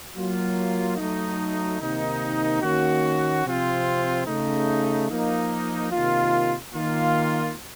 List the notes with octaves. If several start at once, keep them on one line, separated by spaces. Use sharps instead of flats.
F#3 A#3 F4
F#3 A3 D#4
C3 D#3 A#3 D#4
D#3 A#3 C#4 F#4
C3 F3 C4 F4
C#3 A3 D#4
F3 A#3 D#4
C3 D#3 A#3 F4
D#3 A#3 F4